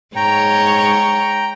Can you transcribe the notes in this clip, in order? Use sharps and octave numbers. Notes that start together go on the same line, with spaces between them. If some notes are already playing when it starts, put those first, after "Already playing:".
G#2 C#5 G5 A#5